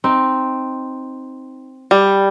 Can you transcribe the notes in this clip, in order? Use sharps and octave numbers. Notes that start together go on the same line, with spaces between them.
C4 D#4
G3